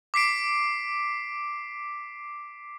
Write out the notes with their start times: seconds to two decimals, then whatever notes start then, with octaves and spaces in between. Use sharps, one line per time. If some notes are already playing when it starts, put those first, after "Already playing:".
0.14 D6 B6 C7 D7